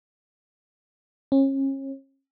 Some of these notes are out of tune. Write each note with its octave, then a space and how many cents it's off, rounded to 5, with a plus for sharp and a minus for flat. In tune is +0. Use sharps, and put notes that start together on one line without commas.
C#4 -35